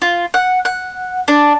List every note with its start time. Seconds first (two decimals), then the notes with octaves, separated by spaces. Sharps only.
0.02 F4
0.34 F#5
0.65 F#5
1.28 D4